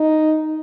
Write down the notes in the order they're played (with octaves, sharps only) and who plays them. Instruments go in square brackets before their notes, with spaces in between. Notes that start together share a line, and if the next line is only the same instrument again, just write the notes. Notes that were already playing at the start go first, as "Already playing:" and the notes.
Already playing: [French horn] D#4